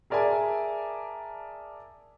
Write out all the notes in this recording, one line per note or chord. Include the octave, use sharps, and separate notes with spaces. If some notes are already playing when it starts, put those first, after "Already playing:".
G#4 A#4 D5 E5 G#5 A5